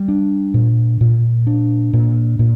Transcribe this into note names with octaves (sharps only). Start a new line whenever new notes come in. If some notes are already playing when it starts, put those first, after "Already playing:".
Already playing: G3
D4
A#2
A#2
D4
A#2
A#2